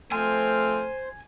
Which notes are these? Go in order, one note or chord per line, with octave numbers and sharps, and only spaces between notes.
F3 A3 C4 C5 G#5 F6